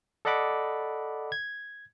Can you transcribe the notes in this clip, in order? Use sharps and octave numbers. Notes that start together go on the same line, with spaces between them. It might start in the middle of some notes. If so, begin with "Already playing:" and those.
A4 D5 D#5 F#5 B5 D6
G#6